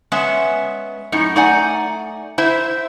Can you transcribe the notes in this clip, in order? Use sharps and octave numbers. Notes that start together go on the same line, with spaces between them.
G#3 B3 C#4 E5
F#2 A2 D#4
A3 D#4 D5 F#5 G#5
E4 C5 E5